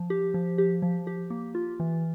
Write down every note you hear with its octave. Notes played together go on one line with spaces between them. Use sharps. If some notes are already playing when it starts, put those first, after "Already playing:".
Already playing: F3
G4
F3
G4
F3
G4
A#3
F4
E3